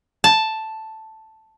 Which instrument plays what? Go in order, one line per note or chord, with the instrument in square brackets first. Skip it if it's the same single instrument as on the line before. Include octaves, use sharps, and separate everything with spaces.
[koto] A5